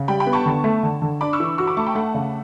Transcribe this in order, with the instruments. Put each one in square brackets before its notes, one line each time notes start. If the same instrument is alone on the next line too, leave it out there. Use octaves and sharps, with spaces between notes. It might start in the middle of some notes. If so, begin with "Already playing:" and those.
Already playing: [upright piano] C#3 [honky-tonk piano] F#5
[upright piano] G3 [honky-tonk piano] G5 B5
[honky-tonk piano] G5 B5
[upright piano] B3
[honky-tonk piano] A5 C#6
[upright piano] D3
A3
D3
D3
[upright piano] D4 [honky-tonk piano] B5 D6
[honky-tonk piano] C#6 E6
[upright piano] E3
[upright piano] F#4 [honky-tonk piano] C#6 E6
[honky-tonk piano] B5 D6
[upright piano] A3 [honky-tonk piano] A5 C#6
[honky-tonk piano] G5 B5
[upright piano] A3 [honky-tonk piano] F#5 A5
[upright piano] C#3